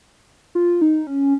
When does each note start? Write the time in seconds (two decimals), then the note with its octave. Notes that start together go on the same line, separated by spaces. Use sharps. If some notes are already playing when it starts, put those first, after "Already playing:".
0.55 F4
0.82 D#4
1.07 C#4